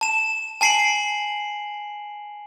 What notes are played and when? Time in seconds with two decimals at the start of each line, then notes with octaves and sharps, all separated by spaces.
0.01 A5 E7
0.61 G#5 A5 C7 D7 F#7